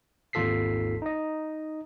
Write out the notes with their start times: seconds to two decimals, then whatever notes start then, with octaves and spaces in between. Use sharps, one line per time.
0.33 G#1 D#2 F4 A4 B6 C7
1.02 D#4 D#5